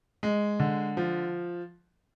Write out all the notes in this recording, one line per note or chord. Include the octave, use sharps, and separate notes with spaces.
G#3
D3
F3